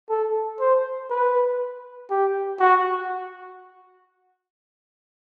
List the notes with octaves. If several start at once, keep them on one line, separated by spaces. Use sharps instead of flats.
A4
C5
B4
G4
F#4